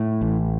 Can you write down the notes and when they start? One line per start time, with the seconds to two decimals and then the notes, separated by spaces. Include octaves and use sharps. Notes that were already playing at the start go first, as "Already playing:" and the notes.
Already playing: A2
0.21 A1